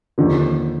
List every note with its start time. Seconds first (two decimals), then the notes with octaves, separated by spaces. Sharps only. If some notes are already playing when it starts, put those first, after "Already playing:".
0.18 D#2 D3 F3